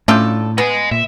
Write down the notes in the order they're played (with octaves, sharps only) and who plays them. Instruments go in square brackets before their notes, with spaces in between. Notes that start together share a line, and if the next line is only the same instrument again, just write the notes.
[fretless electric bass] A2 [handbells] A3 C#4 G6 [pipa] D4 F4 A4
[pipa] B3 [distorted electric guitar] D#5 G#5
[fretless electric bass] A#2 [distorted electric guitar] E5